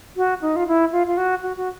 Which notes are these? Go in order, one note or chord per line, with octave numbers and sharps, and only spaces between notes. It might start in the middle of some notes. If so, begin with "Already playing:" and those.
F#4
D#4
F4
E4
F4
F4
F#4
F#4
F#4